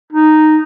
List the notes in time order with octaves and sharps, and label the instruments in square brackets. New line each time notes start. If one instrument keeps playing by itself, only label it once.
[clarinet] D#4